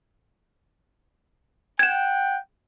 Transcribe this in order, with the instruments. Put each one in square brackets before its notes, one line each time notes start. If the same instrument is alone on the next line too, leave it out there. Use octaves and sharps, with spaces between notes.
[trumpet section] F#5 G5 [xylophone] G#6 E7